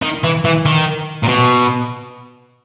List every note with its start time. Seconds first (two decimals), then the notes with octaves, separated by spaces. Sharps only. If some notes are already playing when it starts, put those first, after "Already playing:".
0.02 D#3
0.24 E3
0.45 E3
0.66 D#3
1.24 A#2
1.28 B2